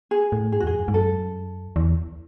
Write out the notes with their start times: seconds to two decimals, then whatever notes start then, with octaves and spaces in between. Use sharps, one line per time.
0.11 G#4
0.32 A2
0.52 G#2 G#4
0.60 F#4
0.63 E2 G#4
0.72 F#2
0.88 G#2
0.94 F#2 A4
1.76 E2